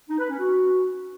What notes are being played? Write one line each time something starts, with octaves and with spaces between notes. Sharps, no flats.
D#4
B4
C#4
F#4